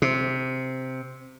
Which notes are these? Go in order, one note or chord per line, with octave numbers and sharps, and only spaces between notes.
C3